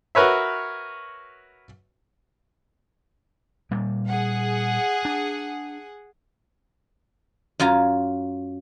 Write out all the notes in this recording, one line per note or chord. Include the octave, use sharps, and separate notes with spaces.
F#4 A#4 B4 C#5 E5
A#2 G3 A#3
G#4 F#5
D4
F#2 F4 G#5 A#5